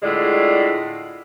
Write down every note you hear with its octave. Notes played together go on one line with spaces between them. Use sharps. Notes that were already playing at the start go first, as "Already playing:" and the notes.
A2 D3 G#3 F4 D5